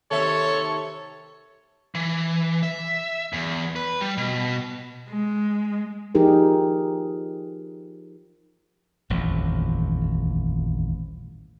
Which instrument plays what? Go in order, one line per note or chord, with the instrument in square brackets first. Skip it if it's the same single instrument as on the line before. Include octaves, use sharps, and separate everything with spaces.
[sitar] D#2 C3 E5 [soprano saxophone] A4 [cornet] C#5
[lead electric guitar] E3
E5
E2
B4
G3
B2
[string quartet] G#3
[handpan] F3 D#4 G4 G#4 A#4
[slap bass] D#1 A1 F2